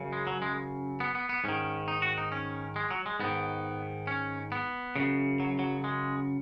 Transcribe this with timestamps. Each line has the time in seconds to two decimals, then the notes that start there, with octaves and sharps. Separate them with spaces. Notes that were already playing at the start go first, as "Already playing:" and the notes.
Already playing: F#2 C#3
0.13 G#3
0.27 F#3
0.42 G#3
1.00 B3
1.15 B3
1.29 B3
1.44 G#2 D#3 C#4
1.88 D#4
2.02 F#4
2.18 D#4
2.32 C#4
2.76 G#3
2.91 F#3
3.06 G#3
3.20 G#2 D#3 B3
4.07 C#4
4.52 B3
4.96 F#2 C#3
5.40 F#3
5.59 F#3
5.84 G#3